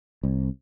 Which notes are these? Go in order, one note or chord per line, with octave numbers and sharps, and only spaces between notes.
C2